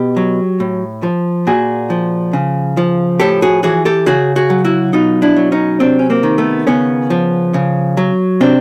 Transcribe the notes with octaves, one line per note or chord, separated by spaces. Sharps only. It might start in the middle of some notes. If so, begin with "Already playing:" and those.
Already playing: B2 G4
F#3
A2
F3
A#2 F#4 G#4
F3
C#3
F3
A2 G4 A4
F#4 G#4
E3 F#4 G#4
G4 A4
C#3 F#4 G#4
F#4 G#4
F#3
E4 F#4
B2 D#4 F4
D4 E4
F#3
C#4 D#4
C3 C4 D4
C#4
A#3 C4
D#3
A3 B3
C#3 B3 C#4
F3
C#3
F#3
C3 C4 D4